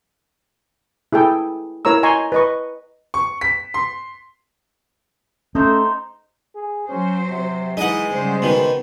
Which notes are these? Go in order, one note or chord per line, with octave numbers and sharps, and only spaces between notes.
E4 G#4 A4 G5
E4 A#4 C#5 A#5 E6
D#5 G#5 A#5 C6 C#6
B4 D#5 C#6
C#6
B6
C6
A3 C#4 D#4 C5 A#5
G#4
F#3 C#4 C5
C3
E3 G#3 D#4 D#5 F#5
C#3 G3 C5
B2 D#3